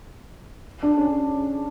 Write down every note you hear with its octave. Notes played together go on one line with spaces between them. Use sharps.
D4
C#4